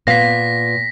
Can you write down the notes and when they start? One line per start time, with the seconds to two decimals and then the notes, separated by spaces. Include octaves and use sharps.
0.07 A#2 B3 F5 A#6 B6